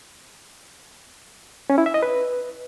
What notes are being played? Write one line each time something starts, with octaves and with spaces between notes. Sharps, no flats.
C#4
E4
E5
D#5
B4